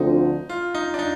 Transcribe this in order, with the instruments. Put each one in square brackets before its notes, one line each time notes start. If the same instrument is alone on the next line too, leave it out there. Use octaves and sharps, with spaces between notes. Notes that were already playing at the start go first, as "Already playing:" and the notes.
Already playing: [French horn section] D2 D3 F3 C4 [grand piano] D#4
[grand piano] F4
D#4
D4
D#4